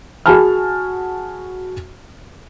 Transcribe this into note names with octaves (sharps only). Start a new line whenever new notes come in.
F#4 G#4 G#5 A5 B5 F6